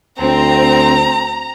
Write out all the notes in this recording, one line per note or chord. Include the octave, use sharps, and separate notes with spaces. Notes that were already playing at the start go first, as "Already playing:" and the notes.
D2 C4 A#5